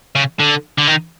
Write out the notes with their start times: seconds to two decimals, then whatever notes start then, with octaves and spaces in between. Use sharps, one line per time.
0.15 C#3
0.40 D3
0.78 D3
0.87 D#3